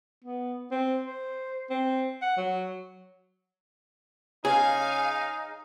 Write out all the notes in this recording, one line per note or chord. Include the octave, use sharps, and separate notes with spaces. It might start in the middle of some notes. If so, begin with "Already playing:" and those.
B3
C4
C5
C4
F#5
F#3
C#3 D#4 G#4 F5 G#5